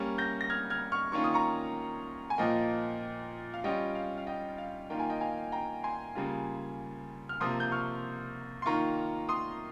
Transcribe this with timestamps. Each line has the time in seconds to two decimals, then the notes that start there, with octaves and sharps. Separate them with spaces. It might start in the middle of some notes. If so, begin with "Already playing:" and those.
Already playing: G3 A#3 C#4
0.18 G6 A#6
0.41 A#6
0.50 F6 G#6
0.70 F6 G#6
0.92 C#6 F6
1.12 D#3 A#3 C#4 F4 C#6
1.24 D#6
1.34 A#5 C#6
2.30 G#5
2.38 A#2 F3 A#3 D#5 G5
3.54 F5
3.64 G3 C#4 F4 D#5 G5
3.95 F5
4.18 F5
4.26 D#5 G5
4.58 F5
4.90 D#3 A#3 F4 G5
5.00 G#5
5.09 D#5 G5
5.21 F5 G#5
5.52 G5 A#5
5.84 G#5 C6
6.15 C#3 G3 A#3 F4
7.29 F6
7.40 C3 F3 A#3 C6 D#6
7.60 G6
7.72 C#6 F6
8.62 C6
8.66 D#3 A#3 F4 A#5 C#6
9.29 C6 D#6